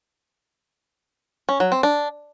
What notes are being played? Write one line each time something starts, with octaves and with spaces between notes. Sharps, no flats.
C#4
F#3
C4
D4